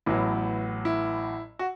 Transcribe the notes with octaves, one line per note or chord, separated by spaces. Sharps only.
A1 A2 F#3 B3 E4
E4
F#4